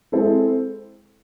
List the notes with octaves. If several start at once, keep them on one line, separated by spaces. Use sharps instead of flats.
G#3 C4 E4 A4